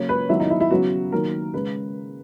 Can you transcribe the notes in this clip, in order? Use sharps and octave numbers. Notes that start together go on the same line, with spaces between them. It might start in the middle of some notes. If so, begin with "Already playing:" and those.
Already playing: C#3 F#3 A#3 C#5
B4
D#3 F#3 B3 E4
D#4
E4
E4
C#3 F#3 B3 F#4
D#3 F#3 A#3 A#4
C#3 G#3 B4